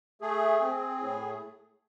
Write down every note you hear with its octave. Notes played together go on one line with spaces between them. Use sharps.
A3 G#4
C4
A2